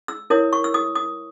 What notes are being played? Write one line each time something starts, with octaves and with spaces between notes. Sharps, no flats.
E6
E4 A#4 C#5 D#6
C#6
E6
D#6
D#6